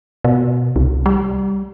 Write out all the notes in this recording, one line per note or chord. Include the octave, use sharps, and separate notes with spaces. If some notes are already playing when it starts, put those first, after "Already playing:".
B2
C2
G3